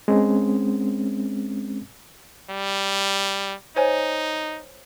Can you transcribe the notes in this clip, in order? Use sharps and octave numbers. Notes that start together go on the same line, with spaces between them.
G#3 C4 C#4
G3
D#4 C5 C#5 G#5